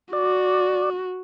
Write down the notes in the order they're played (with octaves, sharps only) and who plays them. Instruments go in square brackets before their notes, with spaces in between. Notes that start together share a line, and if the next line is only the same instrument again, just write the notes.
[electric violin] F#4 [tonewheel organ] D5